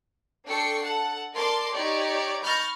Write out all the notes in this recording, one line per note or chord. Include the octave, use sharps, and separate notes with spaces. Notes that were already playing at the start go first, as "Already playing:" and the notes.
D4 A4 G5 C#6 C7 C#7
A4 F#5 A5
A#4 D5 A5 C6 D6
D#4 G4 C#5 D5
B5 C#6 F6 G6 A6 A#6